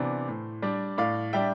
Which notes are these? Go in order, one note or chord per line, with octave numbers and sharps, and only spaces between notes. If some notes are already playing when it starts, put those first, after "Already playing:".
Already playing: C3 E3 B3 D4 C5
A2
G3 D4
A2 D5 F5
G3 D4 E5 G5